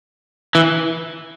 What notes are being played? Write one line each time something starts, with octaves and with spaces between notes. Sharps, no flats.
E3